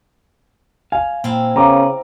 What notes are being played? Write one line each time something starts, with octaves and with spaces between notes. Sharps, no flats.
F5 G#5
A#2 C4 E4 F4
C#3 B3 A#4 A#5 D6